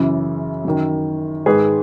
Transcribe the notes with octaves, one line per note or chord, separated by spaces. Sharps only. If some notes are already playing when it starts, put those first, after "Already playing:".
Already playing: F#2 C#3 E3
F#2 D#3
G#2 D#3 G#4 B4